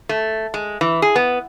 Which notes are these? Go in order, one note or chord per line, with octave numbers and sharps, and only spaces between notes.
A3
G#3
E3
G#4
B3